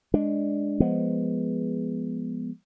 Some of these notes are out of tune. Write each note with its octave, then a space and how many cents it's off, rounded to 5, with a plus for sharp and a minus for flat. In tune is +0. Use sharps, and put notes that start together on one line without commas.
G#3 +0 D4 +0
F3 +0 G#3 +0 B3 +0